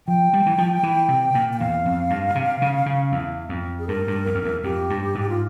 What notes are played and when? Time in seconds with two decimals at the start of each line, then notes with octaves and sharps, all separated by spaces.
0.08 F3 G5
0.33 G3
0.46 E3
0.58 F3
0.83 E3
1.08 C3
1.35 A#2
1.53 G5
1.60 E2 F5
1.86 F2
2.10 G2
2.35 C3
2.62 C#3
2.86 C#3
3.12 E2
3.49 F2
3.79 G#4
3.88 G2 A#4
4.07 G2
4.26 E2
4.35 F2
4.44 E2
4.64 F2 G4
4.90 G2
5.15 G#2
5.29 F4